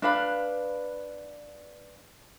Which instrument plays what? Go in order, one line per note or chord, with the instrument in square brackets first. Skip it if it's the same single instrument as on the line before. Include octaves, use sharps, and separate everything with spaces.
[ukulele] D4 B4 F5 B5